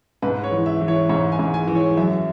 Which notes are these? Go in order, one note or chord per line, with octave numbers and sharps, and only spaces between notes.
G#2 B4
C#5
E3
E5
E3
C#5
G#2 C#5
G#5
G#2
G#5
E3
C#5
F#2 E5